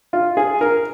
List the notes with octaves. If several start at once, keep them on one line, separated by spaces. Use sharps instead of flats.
F4
G#4
A#4